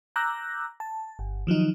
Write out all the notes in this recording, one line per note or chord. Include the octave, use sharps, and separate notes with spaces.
A#5 D6 E6 F#6 G6 A#6
A5
G1
D#3 F3 F#3 D#4